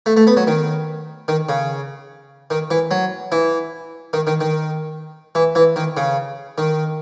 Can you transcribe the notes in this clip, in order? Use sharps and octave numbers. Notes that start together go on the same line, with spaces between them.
A3
A3
B3
F#3
D#3
D#3
C#3
D#3
E3
F#3
E3
D#3
D#3
D#3
E3
E3
D#3
C#3
D#3